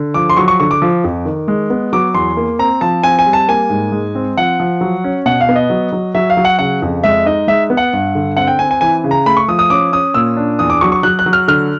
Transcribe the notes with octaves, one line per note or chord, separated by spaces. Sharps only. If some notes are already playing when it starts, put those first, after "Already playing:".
Already playing: D3
F3 D6
C6
F#3 C#6
C#6
D3 C#6
D6
F3
F2
D#3
G#3
B3
F#3 D6
E2 C6
A#3
C4 A#5
F3 A5
C4 G#5
G#5
G3
A5
A#3 G#5
G#2
G#3
C4
F3 F#5
F3
F#3
C#4
B2 F#5
F5
B3
D#5
F#3
F#3
F#3 E5
F5
F#3
F#5
C#3 F#5
F2
G#3 E5
D#4 D#5
G#3 E5
B3
F#5
G2
D3
C4 F#5
G5
C4 G#5
G#5
E3 G#5
C#3
A#5
A3 B5
C#6
F3 D#6
D#6
C#4 D6
C#4 D#6
A#2 E6
D4
E2 D#6
D6
F#3 C#6
C#6
F#3 F#6
F#6
F#3
F6
D3 F6